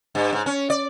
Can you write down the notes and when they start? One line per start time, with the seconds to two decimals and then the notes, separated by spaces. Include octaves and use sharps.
0.15 G2
0.33 G#2
0.46 C#4
0.70 D5